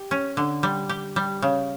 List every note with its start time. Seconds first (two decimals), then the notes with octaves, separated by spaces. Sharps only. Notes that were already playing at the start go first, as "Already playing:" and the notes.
Already playing: G4
0.11 C#4
0.37 D3
0.63 G3
0.89 G4
1.16 G3
1.42 C#3